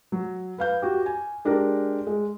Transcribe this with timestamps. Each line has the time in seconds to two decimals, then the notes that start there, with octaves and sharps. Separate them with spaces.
0.12 F#3
0.58 B4 F5 G6
0.82 F#4 G4
1.06 G#5
1.45 G#3 D4 G4 A#4
2.07 G#3